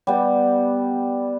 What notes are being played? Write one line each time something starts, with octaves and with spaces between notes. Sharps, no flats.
G3 B3